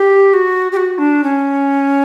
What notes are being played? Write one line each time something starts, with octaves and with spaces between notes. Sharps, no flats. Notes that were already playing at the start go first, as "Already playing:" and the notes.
Already playing: G4
F#4
G4
F#4
D4
C#4